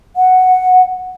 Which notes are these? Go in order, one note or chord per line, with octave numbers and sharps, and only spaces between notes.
F#5